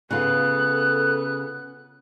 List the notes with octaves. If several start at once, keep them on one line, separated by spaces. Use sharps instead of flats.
C#3 B3 F4 A4 F#6